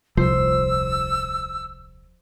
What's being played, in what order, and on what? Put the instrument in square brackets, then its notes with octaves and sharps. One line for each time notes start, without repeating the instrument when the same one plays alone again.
[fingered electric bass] D#1 C2 F3 [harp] C5 [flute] E6